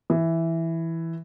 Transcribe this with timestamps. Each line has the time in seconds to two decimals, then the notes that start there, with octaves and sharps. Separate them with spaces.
0.10 E3